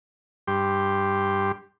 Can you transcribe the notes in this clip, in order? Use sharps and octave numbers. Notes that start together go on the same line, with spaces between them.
G2 G4 C6